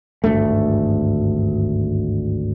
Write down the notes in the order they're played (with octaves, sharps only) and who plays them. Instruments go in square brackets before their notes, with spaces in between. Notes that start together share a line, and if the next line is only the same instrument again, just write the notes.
[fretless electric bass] G#1 D2 G2 A3